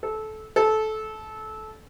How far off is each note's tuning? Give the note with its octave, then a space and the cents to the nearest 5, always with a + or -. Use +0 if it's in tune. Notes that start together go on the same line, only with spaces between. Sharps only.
A4 -20
A4 -20